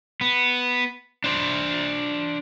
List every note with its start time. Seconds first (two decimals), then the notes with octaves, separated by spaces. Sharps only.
0.21 B3
1.24 D4 C5